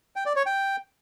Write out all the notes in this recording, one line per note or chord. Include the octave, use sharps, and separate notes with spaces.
G5
D5
C#5
G5